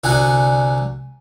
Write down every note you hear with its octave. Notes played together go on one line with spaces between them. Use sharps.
C2 D3 F#4 G#5